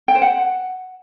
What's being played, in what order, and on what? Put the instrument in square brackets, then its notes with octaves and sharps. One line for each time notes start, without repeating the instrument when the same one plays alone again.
[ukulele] G5
C5
F#5